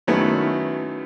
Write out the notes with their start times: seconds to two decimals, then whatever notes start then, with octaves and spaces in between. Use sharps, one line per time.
0.07 F#2 D#3 F#3 A3 B3 E4